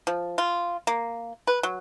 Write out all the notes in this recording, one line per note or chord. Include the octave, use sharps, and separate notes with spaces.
F3
F4
A#3
B4
F#3